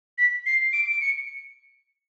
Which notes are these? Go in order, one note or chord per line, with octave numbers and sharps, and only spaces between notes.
B6
C7
D7
D7
C#7